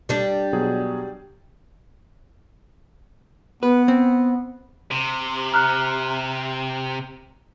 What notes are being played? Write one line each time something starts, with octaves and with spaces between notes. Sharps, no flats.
G3 D4
B2 F#3 G#4
B3 B4
C4
C3
A#5 F6 F#6